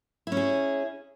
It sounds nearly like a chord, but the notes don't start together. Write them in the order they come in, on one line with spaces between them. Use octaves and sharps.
E4 C#4 G#4